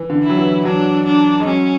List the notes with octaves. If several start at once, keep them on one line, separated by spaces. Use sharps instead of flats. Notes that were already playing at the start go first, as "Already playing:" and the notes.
Already playing: E3
D3
E4
F#3
E3
F#3 D4
D4
G#3
F#3 C#4